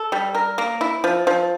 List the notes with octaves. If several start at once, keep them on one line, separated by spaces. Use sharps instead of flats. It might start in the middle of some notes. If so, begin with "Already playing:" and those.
Already playing: A4
G3
A#4
A#3
E4
F3
F3